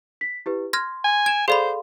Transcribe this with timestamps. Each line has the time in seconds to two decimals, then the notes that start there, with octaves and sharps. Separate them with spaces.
0.21 B6
0.46 E4 G4 B4
0.73 C6 F6 G#6 A#6
1.04 G#5
1.26 G#6 D7 E7
1.48 G#4 A4 C5 D5 F5 B5 C6